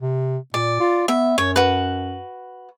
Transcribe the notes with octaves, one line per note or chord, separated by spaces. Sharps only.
C3
A#2 D5
F4
B3 E5
F#2 C#5
F#4 B4